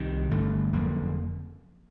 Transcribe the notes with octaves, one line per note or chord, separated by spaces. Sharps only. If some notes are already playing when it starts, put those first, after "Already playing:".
Already playing: C2 C3 D#3
G1 G2 D3 A3
F#1 F2 D3 A#3